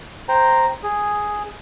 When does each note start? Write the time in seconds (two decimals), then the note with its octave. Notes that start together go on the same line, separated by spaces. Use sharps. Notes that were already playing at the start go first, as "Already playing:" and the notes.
0.29 C5 G5 A#5
0.83 G#4